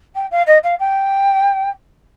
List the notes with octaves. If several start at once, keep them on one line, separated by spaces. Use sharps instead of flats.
G5
F5
D#5
F5
G5